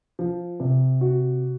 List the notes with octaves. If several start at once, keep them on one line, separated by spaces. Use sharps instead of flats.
F3
C3
F#4